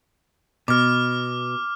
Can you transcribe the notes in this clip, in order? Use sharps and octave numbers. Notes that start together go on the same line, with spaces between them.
B2 D6 F6